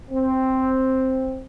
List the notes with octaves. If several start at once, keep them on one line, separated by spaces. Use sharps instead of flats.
C4